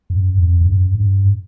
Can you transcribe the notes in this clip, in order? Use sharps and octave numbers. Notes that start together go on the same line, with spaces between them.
F#2
F2
F2
F#2
G2